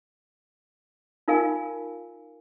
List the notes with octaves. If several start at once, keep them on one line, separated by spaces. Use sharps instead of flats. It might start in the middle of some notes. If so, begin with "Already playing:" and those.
D#4 F4 A#4 F5 G#5